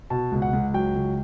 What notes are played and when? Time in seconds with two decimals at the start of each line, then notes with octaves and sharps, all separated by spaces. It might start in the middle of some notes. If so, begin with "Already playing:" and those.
0.10 B2 A5
0.32 C#2
0.42 F#5
0.53 C#2
0.74 F#3 G5
0.95 C#2